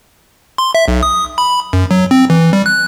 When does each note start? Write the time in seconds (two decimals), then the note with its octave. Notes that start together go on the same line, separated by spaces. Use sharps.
0.58 C6
0.75 E5
0.88 B1
1.03 D#6
1.38 B5
1.73 F#2
1.91 F#3
2.11 C4
2.30 E3
2.53 G3
2.66 F#6